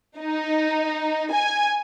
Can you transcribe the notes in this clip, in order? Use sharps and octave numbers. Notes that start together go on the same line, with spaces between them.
D#4
G#5